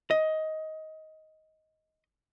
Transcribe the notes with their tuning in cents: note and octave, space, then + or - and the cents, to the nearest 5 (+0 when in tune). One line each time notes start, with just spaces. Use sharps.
D#5 +15